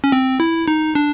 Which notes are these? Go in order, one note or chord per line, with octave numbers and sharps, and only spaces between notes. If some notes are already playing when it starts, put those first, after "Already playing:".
C#4
C4
E4
D#4
D4